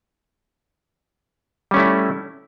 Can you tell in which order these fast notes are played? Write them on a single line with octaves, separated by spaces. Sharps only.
G3 C#4 A3 E4